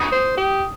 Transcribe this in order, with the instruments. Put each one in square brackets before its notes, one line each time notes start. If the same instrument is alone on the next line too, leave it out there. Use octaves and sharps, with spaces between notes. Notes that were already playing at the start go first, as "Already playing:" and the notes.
Already playing: [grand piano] D#6
[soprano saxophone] C5
G4